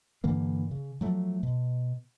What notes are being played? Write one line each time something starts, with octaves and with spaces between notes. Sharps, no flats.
G2 D3 E3 A#3
C#3
F3 F#3 A3
B2